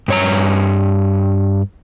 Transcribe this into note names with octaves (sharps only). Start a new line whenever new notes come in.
G2 C#5 A#5